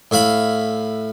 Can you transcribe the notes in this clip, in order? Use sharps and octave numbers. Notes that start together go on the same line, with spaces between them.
A2 E5 F5 B5